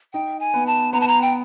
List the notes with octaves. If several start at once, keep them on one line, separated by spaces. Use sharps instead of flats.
D#4 G5
G#5
B3
A5
B3 A#5
A5
A#5
G5